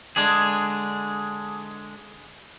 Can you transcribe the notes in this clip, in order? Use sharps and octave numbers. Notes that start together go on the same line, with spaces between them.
D3 G#3 D4 G#4